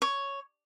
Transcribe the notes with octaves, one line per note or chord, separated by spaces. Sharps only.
C#5